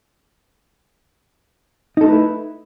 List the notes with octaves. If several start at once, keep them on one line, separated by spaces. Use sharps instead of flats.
A3 D#4 E4 A4 B4